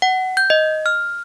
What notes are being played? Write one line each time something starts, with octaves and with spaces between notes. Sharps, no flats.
F#5
G6
D#5
F6